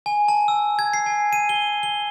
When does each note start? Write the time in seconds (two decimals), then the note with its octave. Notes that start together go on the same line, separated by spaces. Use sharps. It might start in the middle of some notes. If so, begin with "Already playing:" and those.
0.06 G#5
0.28 A5
0.48 E6
0.79 G#6
0.93 C7
1.06 G#5
1.33 D#7
1.49 G7
1.83 G7